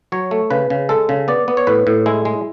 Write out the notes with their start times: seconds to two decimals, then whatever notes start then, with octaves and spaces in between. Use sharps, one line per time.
0.12 F#3 C#5
0.31 A3
0.50 C#3 B4
0.70 C#3
0.89 G#3 A4
1.09 C#3
1.28 B3 D5
1.48 B3
1.57 C#5
1.67 A2 B4
1.87 A2
2.06 G#3 E4
2.25 G#3